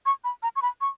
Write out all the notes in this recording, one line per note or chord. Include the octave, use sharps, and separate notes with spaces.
C#6
B5
A#5
C#6
B5
C#6